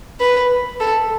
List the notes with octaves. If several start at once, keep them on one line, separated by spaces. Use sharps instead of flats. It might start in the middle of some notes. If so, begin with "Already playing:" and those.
B4
A4